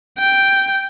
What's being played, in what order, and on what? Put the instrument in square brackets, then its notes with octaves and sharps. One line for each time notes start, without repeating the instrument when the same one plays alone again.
[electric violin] G5